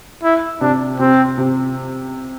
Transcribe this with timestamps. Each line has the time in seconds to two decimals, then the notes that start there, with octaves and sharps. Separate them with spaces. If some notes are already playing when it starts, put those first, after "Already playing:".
0.23 E4
0.61 C3 D4
0.99 C3 C4
1.38 C3